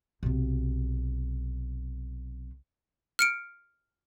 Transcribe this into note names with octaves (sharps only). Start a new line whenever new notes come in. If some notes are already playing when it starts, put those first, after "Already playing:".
B1 C3
F6 C#7 D7